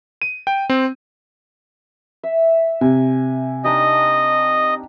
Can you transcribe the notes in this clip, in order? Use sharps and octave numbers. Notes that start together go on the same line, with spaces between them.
D#7
G5
C4
E5
C3 G#5
D4 D#4 G4 D#5